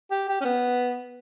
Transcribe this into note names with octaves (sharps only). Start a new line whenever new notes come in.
G4
G4
C#4
B3